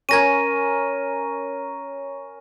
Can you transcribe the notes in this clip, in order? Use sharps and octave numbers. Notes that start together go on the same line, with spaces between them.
C#4 A#4 G#6 A#6 D#7